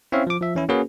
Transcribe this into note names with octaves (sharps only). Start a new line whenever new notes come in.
C4 C#4 E4 C#5 E5 F5
F3 D6
F3 E5
E3 C#4 E4
A#3 C#4 F#4 G#4 B4